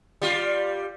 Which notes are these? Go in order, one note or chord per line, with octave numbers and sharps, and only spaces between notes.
G3 F4